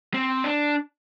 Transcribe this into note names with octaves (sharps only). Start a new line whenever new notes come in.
C4
D4